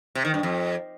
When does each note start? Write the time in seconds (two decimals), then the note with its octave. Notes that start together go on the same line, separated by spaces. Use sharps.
0.15 C3
0.25 D#3
0.34 G2
0.43 F2